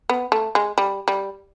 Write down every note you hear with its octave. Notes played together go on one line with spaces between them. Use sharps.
B3
A3
G#3
G3
G3